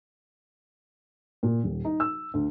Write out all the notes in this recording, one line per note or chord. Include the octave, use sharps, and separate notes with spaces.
A#2
D#1
D#4
E6
D2